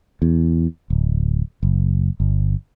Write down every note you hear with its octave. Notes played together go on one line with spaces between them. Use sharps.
E2
D1
F#1
G1